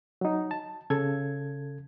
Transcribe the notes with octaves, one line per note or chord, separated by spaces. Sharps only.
F#3 D#4
A5
C#3 A4 G#6